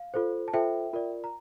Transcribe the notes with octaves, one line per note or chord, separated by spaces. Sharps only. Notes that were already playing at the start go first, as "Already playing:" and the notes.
Already playing: F5
F4 A4 C5
A5
F4 A4 C5 E5 G5
F4 A#4 D5
A#5